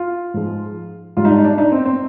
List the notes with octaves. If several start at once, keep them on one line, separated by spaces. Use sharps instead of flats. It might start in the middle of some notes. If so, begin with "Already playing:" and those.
Already playing: F4
G#2 F3 G#3
G#2 G3 F4
D#4
D4
D#4
D4
D#4
C4
C4